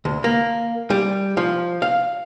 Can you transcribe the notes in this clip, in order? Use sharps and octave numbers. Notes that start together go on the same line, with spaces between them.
D2
A#3
G3
F3
F5